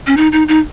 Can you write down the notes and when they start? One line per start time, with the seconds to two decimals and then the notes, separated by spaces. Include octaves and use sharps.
0.07 C#4
0.17 D#4
0.32 D#4
0.48 D#4